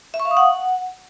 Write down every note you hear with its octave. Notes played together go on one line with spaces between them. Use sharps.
E5
C#6
F5
D#6
F#5